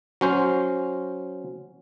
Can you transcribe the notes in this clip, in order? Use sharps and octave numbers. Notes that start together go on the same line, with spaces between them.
F#3 C#4 C5